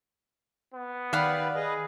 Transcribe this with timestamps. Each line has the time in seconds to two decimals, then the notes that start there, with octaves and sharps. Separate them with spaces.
0.74 B3
1.13 D#3 G4 B4 D5 F5 F#5 B5
1.55 G#4 B4 D#5